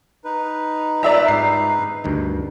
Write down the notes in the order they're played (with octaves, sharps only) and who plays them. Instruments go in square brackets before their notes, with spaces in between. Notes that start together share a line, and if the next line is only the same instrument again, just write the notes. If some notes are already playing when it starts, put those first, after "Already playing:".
[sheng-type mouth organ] D#4 B4
[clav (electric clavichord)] G3 F4 [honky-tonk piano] D5 E5 A#5
[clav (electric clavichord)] G#2 F4 G4 [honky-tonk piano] C7
[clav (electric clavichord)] D2 G2 D#3